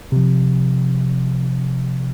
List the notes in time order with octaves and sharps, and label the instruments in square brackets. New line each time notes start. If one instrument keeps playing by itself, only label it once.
[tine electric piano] C3 F3